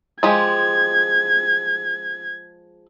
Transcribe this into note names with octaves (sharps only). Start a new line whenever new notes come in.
F3 G#3 G4 G#6